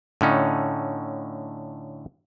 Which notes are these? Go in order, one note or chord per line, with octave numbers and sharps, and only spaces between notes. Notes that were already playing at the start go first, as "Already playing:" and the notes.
A2 D3 C#4 D#4